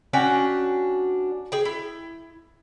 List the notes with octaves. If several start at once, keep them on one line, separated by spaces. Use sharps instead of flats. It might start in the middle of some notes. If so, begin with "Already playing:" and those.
C#4 D4 F#4 G5
G#4 G5
E4